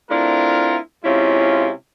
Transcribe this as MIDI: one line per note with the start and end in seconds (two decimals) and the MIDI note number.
0.10 0.78 57
0.10 0.78 60
0.10 0.78 62
0.10 0.78 64
0.10 0.78 65
0.10 0.78 70
1.05 1.71 48
1.05 1.71 56
1.05 1.71 61
1.05 1.71 64
1.05 1.71 65